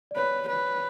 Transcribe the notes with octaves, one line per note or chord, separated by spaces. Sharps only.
D5
B4 C#5
B4